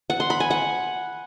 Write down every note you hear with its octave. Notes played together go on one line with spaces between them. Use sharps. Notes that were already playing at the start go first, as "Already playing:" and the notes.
F#5
C6
B5
G#5
F#5